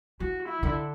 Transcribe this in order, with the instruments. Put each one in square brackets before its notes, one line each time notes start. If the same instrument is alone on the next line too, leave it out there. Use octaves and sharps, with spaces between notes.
[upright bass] E3 [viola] F#4
[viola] E4
[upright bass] D3